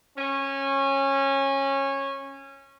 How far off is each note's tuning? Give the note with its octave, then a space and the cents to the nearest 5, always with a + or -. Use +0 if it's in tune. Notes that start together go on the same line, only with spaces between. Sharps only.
C#4 -20